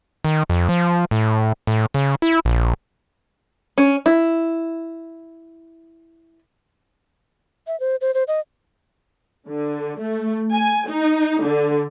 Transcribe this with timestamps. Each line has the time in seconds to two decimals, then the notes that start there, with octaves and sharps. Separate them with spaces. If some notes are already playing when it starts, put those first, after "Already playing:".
0.25 D#3
0.50 F2
0.69 F3
1.11 A2
1.67 A2
1.94 C#3
2.22 E4
2.45 A#1
3.78 C#4
4.06 E4
7.67 E5
7.80 C5
8.01 C5
8.14 C5
8.28 D#5
9.47 D3
9.98 A3
10.51 G#5
10.88 D#4
11.43 D3